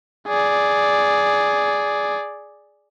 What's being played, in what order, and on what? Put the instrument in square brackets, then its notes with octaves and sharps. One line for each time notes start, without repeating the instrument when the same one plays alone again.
[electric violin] G#4 D5